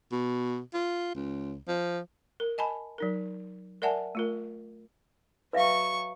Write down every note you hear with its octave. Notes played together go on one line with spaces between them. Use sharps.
B2
F4
C#2
F3
A#4
D#5 G#5 A5 B5
F#3 D#4 A#4
A#4 D5 E5 F#5 G#5 A5
A3 F4 A#4
F#3 B4 E5 F5 C#6